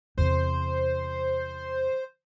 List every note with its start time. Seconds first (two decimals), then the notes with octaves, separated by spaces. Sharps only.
0.18 E2 C3 C5